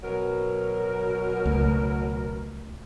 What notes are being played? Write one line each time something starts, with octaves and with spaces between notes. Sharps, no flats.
B2 F#3 A#4
C#2 A3